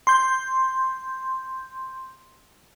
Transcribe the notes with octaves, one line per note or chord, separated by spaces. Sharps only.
C6 G6